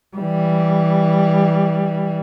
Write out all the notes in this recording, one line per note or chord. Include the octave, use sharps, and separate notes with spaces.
E3 G3